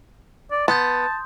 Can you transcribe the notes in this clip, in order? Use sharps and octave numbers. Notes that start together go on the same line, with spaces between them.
D5
B3 A5 C6 D#6 G6